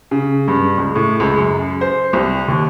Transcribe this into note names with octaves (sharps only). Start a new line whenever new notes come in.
C#3
G2
C#2
A2
C#2
F#2
C5
C2
D#2